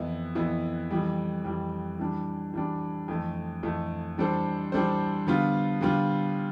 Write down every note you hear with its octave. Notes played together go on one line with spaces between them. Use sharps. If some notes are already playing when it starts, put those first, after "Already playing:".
Already playing: F2 E3 B3 E4
F2 E3 B3 E4
F2 E3 G3
F2 E3 G3
E3 G3 D4
E3 G3 D4
F2 E3 A3
F2 E3 A3
E3 G3 D4 A4 C5
E3 G3 D4 A4 C5
D3 G3 B3 F4
D3 G3 B3 F4